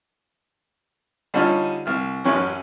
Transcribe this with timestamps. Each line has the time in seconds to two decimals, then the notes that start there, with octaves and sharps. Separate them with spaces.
1.34 D3 G3 C#4 D#4 F4 F6
1.86 C2 F6
2.24 A1 F#2 F#3 C#4